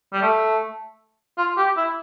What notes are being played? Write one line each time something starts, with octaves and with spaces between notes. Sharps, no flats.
G3
A3
F4
G4
E4